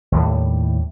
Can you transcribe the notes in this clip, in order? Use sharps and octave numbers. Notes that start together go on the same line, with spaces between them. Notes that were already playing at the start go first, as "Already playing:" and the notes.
D#2 A2 G3